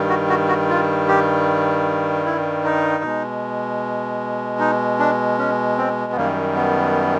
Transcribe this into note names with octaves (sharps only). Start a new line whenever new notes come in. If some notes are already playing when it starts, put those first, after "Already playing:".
Already playing: G2 D#3 G3
F#4
F#4
F#4
F4
G4
E4
D#4
B2 G#3
D#4
D4
C#4
C4
B3
F#2 D#3 G3 A#3
B3